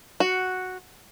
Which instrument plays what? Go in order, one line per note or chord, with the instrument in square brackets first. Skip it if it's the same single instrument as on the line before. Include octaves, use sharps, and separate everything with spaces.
[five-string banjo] F#4